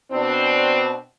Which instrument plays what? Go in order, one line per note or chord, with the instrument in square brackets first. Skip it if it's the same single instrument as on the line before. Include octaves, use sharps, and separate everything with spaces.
[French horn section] B2 C4 D4